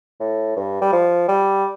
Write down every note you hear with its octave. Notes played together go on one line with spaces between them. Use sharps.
A2
G2
G3
F3
G3